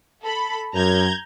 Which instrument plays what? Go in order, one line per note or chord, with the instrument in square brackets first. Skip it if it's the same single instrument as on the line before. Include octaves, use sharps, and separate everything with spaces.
[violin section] A4 B5
[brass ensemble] F#2 [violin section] A#5 G6 G#6